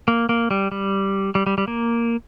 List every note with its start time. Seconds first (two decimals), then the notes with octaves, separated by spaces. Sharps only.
0.08 A#3
0.29 A#3
0.51 G3
0.72 G3
1.35 G3
1.46 G3
1.58 G3
1.68 A#3